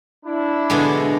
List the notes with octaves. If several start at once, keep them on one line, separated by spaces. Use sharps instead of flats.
D4 E4
B2 D3 G#3